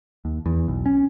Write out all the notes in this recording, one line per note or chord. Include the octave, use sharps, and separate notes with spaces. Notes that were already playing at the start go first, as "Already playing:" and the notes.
D#2
E2
B1
C#4